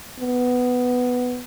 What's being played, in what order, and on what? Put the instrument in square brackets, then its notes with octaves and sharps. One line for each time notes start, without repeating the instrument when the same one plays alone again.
[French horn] B3